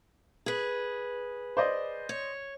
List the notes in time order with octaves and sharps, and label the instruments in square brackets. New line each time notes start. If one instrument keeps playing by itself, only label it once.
[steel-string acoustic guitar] G#4 B4
[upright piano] C5 D5 D#5
[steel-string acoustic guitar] C#5